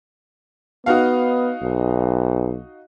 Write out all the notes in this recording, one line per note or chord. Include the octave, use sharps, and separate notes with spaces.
B3 D#4 F#4 F5
B1